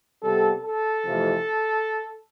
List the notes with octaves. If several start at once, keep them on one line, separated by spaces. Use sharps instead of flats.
C3 G3 B3 A4
A4
F2 C3 E3 A3